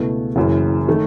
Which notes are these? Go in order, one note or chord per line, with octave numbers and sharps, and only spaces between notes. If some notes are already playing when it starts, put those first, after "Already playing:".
Already playing: C#2 B2 A3 E4 B4
F#1 F#2 E3
D#3 A3